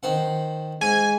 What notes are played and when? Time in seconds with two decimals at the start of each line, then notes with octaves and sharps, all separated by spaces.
0.03 D#3 C5 F#5
0.81 G#2 G#5